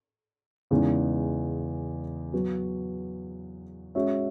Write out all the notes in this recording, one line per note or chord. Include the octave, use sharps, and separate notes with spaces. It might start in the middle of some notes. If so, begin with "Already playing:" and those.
E2 C#3 G#3 D#4
F#3 B3 F#4
G#3 C#4 F#4 C#5 E5